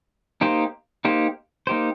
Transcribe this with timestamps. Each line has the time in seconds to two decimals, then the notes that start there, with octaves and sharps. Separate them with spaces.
0.41 A#3 D#4 G4 C5
1.05 A#3 D#4 G4 C5
1.67 A#3 D#4 G4 C5